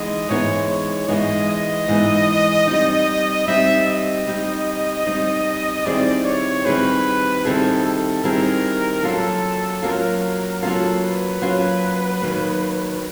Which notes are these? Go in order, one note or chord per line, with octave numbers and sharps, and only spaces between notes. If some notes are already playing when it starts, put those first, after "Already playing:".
Already playing: E3 G#3 B3 D#4 D#5
G#2 E3 G#3 B3 D#4 C#5
C#5
G#2 E3 G#3 B3 D#4 D#5
D#5
G#2 E3 G#3 B3 D#4
G3 C4 D#4
G3 C4 D#4 E5
D#5
G3 C4 D#4
G3 C4 D#4
D#3 G3 C4 E4 G#4 D5
C#5
D#3 G3 C4 E4 G#4 B4
D#3 G3 C4 E4 G#4 A4
A4
D#3 G3 C4 E4 G#4 A#4
F#3 A#3 C#4 F4 A4
F#3 A#3 C#4 F4 A#4
F#3 A#3 C#4 F4 A4
B4
F#3 A#3 C#4 F4
D#3 F#3 A#3